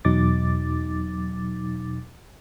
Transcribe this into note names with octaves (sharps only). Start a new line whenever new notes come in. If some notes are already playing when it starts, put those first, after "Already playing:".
E2 B2 F#3 D#4 D6 A6